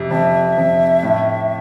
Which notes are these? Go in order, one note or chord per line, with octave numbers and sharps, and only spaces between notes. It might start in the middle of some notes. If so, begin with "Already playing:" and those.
Already playing: F2 C3
F2 E5
F2
A2